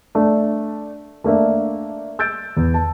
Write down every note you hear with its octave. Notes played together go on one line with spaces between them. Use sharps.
A3 D4
A3 A#3 D4 E5
E6 G6 A6 D7
E2
A5